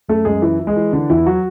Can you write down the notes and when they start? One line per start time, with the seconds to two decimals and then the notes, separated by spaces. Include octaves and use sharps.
0.08 F#2 A3 A4
0.25 F#2 G#3 G#4
0.42 E3 E4
0.60 E3
0.67 G#3 G#4
0.76 E3
0.92 D3 D4
1.10 E2 E3 E4
1.26 F#3 F#4